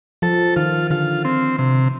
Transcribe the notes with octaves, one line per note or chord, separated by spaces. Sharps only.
F3 A4
D#3 F4
D3 F4
C4
C3